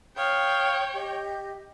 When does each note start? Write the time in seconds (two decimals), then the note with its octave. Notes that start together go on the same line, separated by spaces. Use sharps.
0.17 C#5 F5 G5 D#6 F6
0.94 G4 D#5 G6